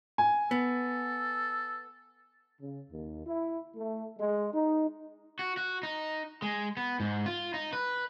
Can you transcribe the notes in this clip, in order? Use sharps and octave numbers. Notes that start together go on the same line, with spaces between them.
G#5
B3 A4
C#3
D#2
E4
A3
G#3
D#4
F#4
F#4
D#4
G#3
B3
G#2
F4
D#4
B4